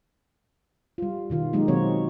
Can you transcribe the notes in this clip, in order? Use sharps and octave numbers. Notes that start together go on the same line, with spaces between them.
G3 F4
B2 D#3 F4
F#3 G#3 A#3 D#4 G4
B2 D#3 F#3 C4 F#4 C#5